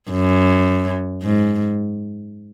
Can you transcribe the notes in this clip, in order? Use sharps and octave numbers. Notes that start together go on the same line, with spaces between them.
F#2
G#2